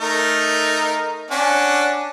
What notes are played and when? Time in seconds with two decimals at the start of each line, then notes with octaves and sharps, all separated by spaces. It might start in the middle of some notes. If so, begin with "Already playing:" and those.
0.01 A3 D#4 A#4
1.31 C#4 D4 F#5